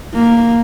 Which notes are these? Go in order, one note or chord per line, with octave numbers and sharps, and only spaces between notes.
A#3